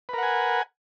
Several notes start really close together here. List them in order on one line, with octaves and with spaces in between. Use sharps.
B4 A#4 F#5 G#5